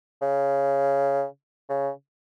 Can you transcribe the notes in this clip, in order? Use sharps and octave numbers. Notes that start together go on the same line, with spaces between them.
C#3
C#3